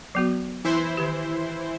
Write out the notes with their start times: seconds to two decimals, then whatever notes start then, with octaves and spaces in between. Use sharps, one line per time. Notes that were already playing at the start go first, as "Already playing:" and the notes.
0.15 F#3 B3 F#4
0.65 E3 E4 C5
0.97 D#3 G4